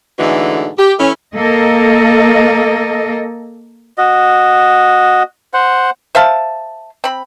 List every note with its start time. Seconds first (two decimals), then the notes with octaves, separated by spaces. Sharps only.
0.19 G#2 B2 D3 E3 A3
0.78 G4
0.99 E3 A3 C#4
1.35 A#3 A4 D#5
3.98 F#4 D#5
5.54 C5 F#5
6.15 C5 E5 F5 A5
7.04 C4 B5